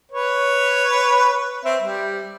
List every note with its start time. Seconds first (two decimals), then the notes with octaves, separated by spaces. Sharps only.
0.11 B4 C#5
1.65 C4 E5
1.81 G3